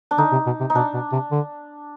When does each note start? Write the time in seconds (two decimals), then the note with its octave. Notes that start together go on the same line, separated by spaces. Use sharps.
0.11 D4
0.18 D3 D#4
0.32 C3
0.46 B2
0.60 C3
0.70 D#4
0.75 B2 D4
0.94 B2
1.12 C3
1.32 D3